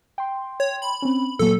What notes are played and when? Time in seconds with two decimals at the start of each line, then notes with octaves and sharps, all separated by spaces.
0.18 G5 C6
0.60 C#5
0.82 B5
1.02 C4 C#4
1.39 A#2 F#3 A#3 A4